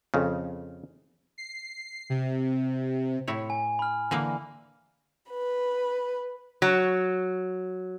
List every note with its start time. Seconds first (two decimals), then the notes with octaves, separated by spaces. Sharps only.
0.14 F2 C#3
1.38 C7
2.10 C3
3.28 A2 E4 C#5
3.50 G#5
3.79 B5 F6
4.11 D3 E3 A#3
5.30 B4
6.62 F#3